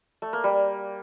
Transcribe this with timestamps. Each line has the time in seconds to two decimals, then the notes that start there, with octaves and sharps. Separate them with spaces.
0.22 A3
0.33 A#3
0.44 G3